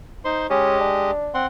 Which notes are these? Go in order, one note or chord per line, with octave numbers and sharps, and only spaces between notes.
D#4 C5 C6
G#3 C#4 G4 D#5
D4
C4 F#5 C6